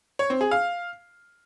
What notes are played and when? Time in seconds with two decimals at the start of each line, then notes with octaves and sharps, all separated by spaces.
0.19 C#5
0.30 C4
0.41 G#4
0.51 F5